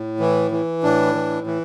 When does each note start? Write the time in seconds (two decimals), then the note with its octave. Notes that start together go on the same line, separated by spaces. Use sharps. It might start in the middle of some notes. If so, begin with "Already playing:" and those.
Already playing: A2
0.20 E3
0.51 E3
0.83 A2 D4
1.15 E3
1.47 E3